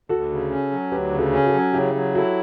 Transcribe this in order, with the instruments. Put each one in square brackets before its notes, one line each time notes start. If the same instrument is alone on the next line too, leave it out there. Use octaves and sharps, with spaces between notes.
[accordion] D2 [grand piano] F#4 A4
[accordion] C#3
C#4
F#3
[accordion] D2 [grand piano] G4 B4
[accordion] C#3
[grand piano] F#4 A4
[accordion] C#4
[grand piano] F#4 A4
[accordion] F#3
[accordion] C#3 [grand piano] E4 G4
[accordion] F#3
[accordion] E4 [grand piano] F#4 A4